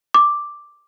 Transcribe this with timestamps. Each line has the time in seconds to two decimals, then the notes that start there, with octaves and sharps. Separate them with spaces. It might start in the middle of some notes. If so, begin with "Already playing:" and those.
0.14 D6